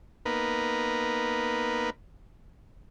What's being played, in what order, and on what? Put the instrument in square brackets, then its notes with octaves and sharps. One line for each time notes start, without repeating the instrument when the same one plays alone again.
[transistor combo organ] A#3 B3 D#4 A#4 B4